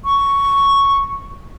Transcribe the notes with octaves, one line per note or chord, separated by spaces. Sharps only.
C#6